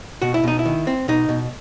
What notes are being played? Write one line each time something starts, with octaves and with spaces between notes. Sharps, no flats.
B2 F#4
E4
B2 D#4
E4
D#3
C4
B2 D#4
B2